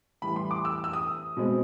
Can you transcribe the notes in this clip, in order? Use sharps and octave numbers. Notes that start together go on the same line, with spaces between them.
A2 E3 G3 B5
C6
D6
E6
E6
D#6
B2 G#3 C4